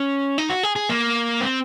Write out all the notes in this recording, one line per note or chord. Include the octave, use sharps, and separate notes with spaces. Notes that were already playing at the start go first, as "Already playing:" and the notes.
Already playing: C#4
D#4
F#4
G#4
G#4
A#3
C4